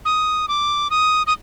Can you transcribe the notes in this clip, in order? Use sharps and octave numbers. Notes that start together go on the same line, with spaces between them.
D#6
D6
D#6
D#6